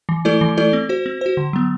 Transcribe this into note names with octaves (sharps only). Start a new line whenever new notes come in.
E3
A3 E4 A4 D5
E3
A3 E4 A4 D5
C4
F#4 C5
C4
F#4 C5
D3
F#3 B3